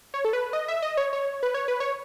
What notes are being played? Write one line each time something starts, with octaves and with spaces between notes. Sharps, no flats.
C#5
A4
B4
D#5
E5
D#5
C#5
C#5
B4
C#5
B4
C#5